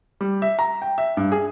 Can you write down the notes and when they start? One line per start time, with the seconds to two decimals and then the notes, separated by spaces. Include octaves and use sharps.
0.21 G3
0.42 E5
0.59 A#5
0.82 G5
0.98 E5
1.17 G2
1.32 G#4